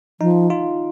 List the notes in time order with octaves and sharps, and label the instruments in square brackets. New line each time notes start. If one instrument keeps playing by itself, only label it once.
[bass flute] F3 [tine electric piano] D#4
[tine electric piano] F4